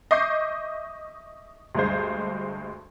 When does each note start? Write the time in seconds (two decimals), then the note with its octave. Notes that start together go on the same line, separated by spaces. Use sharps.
0.11 D#5 E5 C#6 D6 G6 C7
1.75 D2 G2 G#3 C5